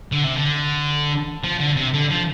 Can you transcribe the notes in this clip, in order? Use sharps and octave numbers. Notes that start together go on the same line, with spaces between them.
D3
C3
D3
F3
D3
C3
D3
F3